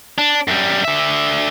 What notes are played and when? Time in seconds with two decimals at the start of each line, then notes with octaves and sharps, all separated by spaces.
0.18 D4
0.48 F#2 G3
0.85 D3 E5